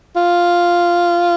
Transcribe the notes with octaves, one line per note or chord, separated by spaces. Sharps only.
F4